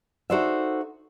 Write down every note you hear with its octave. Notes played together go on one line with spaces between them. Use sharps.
D#4 F#4 A4 C5 D5 E5